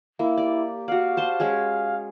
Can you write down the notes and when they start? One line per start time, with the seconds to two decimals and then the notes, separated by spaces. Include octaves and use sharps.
0.19 A#3 E4
0.37 G4 D5
0.88 F#4 D5 F5
1.17 C5 A5 C6
1.40 G#3 C#4 G#4